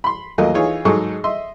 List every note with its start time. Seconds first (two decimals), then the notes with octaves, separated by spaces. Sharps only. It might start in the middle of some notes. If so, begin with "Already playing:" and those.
0.04 B5 C6
0.38 D#2 F#3 A3 A#3 F4 D#5
0.54 E3 D#4 F4 G#4 C#5
0.85 G#2 F#3 D#4 G#4 A4 C#6
1.24 D#5 E5 C6